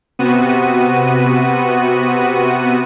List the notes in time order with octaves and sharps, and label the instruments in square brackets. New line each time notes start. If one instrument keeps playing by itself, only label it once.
[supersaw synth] C3 B3 F#4 D#7